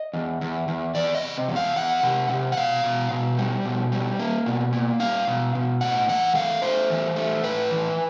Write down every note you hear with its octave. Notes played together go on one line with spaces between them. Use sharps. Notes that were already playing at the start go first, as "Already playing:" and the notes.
Already playing: D#5
E2
E2
E2
E2 D5
D#5
C3
E2
F5
E2 F#5
C3
C3
F#5
B2 F5
B2
B2
G3
B2
G3
A#3
B2
A#3
G3 F5
B2
B2
A2 F#5
E3 F#5
A3 F5
A3 C5
E3
A3
A2 B4
E3